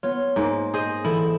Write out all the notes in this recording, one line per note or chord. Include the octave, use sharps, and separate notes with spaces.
B3 F4 C#5
G#2 A#3
G#4 C5 D#5
E3 E4 A4